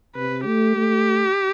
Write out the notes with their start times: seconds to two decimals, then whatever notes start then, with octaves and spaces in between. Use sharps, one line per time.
0.16 C3 B4
0.46 A3 G4
0.77 A3